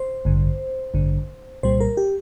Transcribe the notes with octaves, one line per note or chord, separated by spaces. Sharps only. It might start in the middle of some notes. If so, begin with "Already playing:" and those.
Already playing: C5
A1 G2 D3
A1 G2 D3
C2 A#2 G3 C5
A#4
G4